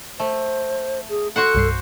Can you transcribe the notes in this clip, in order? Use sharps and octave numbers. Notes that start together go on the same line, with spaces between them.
A3 C5
G#4
F#4 A4 C5 F#5
C2 G2 C7